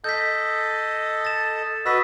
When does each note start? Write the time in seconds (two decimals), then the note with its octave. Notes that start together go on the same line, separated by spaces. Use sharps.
0.04 A4 D#5 G6 B6
1.25 A6 E7
1.86 F#4 B4 D#5 E6 B6